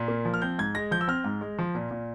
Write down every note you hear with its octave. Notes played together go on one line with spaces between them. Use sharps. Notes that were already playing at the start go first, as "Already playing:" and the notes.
Already playing: A#2
A#3
F3
F6
C4 G6
G#2 G#6
G#3 A#6
F3 G6
E6
C4 F6
G#2
G#3
F3
A#2
A#2